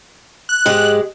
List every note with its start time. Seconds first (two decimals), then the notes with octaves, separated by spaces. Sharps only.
0.49 F#6
0.66 G#2 G#3 G4